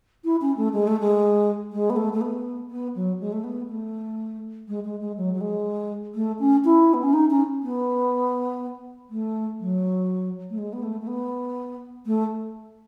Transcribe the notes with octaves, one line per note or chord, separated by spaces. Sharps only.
E4
C#4
A3
G#3
A3
G#3
G#3
B3
A3
A3
B3
B3
F#3
G#3
A3
B3
A3
G#3
G#3
G#3
F#3
F#3
G#3
A3
C#4
E4
B3
C#4
D#4
C#4
B3
A3
F#3
A3
G#3
B3
A3
A3
B3
A3